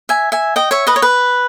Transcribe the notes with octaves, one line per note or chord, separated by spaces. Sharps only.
E5 G#5
E5 G#5
D#5 G5
C#5 E5
B4 D#5
C#5
B4